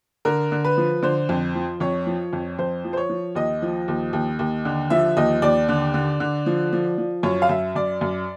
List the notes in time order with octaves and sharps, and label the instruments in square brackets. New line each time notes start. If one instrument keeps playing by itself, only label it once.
[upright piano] D3 A#4
D3
B4
F3
D3 C5
F2
F3
F2 C#5
F3
F2
F2 C5
F3
C5
C#5
F3
D#2 D#5
F3
D#2
D#2
D#2
D3
F3 E5
D#2 D#5
D#2 D5
D3
D3
D3
F3
F3
F3
F#2 C#5
F5
F#2 E5
F#2 D5
F#2